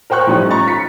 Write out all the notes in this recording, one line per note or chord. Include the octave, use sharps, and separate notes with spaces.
A#4 C5 G5 C#6 F#6
A2 F3 G3 C#4 D#4
A#5 B5 C#6 A6
F4 B6 C#7